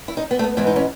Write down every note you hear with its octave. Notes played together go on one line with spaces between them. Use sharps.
E4
D#4
B3
A3
B3
G#2 E3 G#3 B3
D#4
C#4